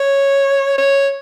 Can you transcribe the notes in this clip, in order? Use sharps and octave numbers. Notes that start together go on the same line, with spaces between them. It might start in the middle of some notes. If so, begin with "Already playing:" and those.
Already playing: C#5
C#5